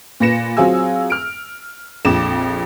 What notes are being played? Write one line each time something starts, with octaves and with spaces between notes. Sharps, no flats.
A#2 B4 A#6 C#7 E7
F#3 C4 F4 G#4 G#5 E6
F6 D7
A#1 F2 D6 E7